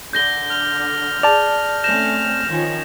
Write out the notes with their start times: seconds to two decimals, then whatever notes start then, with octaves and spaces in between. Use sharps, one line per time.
0.13 D3 G6 A#6 G7
0.50 F6
1.23 G#4 D5 A5 F7
1.84 A3 C4 C#4 G6 A#6 E7
2.47 D#3 F3 C#4